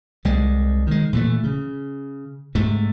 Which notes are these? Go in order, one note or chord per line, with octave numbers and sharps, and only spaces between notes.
C2 G3 G#3
D#3 G#3
A#2 E3 F#3 A3
C#3
G#2 C3 A3